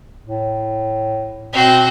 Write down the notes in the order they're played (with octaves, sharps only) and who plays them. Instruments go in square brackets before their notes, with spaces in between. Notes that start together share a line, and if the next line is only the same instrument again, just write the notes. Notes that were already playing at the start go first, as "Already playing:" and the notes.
[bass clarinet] A2
[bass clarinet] B2 [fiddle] C4 F#4